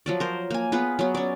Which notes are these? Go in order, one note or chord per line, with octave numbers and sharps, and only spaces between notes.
F3 F#3 D5
A#4 C5
A#3 G#5
B3 F4 G#4 B4
F#3 B3
C#4 D5